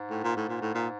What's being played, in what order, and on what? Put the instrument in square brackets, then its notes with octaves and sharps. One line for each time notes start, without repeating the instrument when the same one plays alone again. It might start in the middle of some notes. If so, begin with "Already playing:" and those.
Already playing: [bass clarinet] G#2
[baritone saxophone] A2
A#2
A2
A#2
A2
A#2